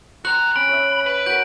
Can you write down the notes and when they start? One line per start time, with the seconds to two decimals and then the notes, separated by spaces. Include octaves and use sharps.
0.25 F#4 C5 G5 A#5 F#6
0.56 C#4 B5 D7
0.69 C#5 E5
1.06 B4 F#7
1.26 F#4 A#4 G6 D7